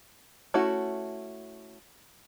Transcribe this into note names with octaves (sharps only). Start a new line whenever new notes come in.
A3 C#4 E4 F#4